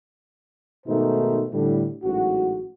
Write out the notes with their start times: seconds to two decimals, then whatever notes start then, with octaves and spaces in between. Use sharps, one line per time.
0.87 G#2 B2 D#3 A3 D#4 C5
1.53 A2 D3 G3
2.04 A1 G#2 F#3 F#4